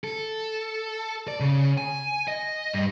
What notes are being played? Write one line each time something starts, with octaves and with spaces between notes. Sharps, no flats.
A4
D5
C#3
G#5
D#5
G2